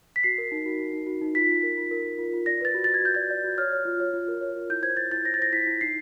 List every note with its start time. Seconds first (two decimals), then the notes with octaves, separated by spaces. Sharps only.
0.16 B6
0.24 F#4 C7
0.38 A#4
0.52 D#4
0.66 F#4
0.80 F#4
0.93 D#4
1.07 F#4
1.21 D#4
1.35 F4 B6
1.49 F4
1.63 A#4
1.78 F4
1.91 A#4
2.05 A#4
2.19 F4
2.33 F4
2.46 D5 A#6
2.61 B4 A6
2.74 F#4
2.84 F#4 A6
2.94 G#6
3.02 F#4 G6
3.15 D5 G#6
3.31 D5
3.44 F#4
3.58 C#5 F6
3.72 C#5
3.85 F4
4.00 C#5
4.13 F4
4.28 A#4
4.41 C#5
4.56 F4
4.70 E4 G6
4.83 C5 G#6
4.97 C5 A6
5.11 E4 A6
5.25 C5 A#6
5.34 A6
5.39 C5 A#6
5.52 E4 B6
5.67 E4
5.81 D#4 C7